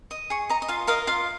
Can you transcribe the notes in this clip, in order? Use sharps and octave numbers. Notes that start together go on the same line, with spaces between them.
D#5
G#4 C#6
D#5 A#5
D#5
F4 F5
A#4 D#5 F5
F4 F5